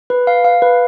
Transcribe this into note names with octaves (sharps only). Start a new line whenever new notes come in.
B4
F5
F5
B4